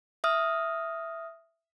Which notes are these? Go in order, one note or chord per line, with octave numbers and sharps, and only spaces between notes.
E5 D#6 F6